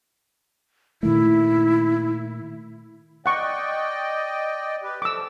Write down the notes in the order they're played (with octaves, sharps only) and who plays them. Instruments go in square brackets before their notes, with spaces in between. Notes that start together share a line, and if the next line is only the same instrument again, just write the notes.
[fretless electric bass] A#2 D#3 A3 [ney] E4
[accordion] D5 D#5 G5 [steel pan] F#5 C#6
[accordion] G4 B4
[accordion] F3 A4 [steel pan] D6 E6